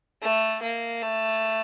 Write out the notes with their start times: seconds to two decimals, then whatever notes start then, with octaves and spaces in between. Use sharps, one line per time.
0.22 A3
0.62 A#3
1.02 A3